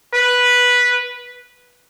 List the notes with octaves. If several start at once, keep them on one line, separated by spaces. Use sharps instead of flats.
B4